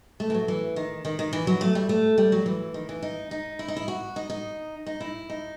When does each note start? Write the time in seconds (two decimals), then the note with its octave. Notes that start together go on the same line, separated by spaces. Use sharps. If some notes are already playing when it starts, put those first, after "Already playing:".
0.20 A3
0.30 E3
0.34 F#3
0.48 E3
0.76 D#3
1.05 D#3
1.19 D#3
1.33 E3
1.47 F#3
1.61 A3
1.75 G3
1.89 A3
2.18 G3
2.32 F#3
2.46 E3
2.74 D#3
2.89 E3
3.03 D#4
3.31 D#4
3.59 E4
3.68 D#4
3.77 E4
3.88 F#4
4.16 D#4
4.30 D#4
4.86 D#4
5.01 E4
5.30 D#4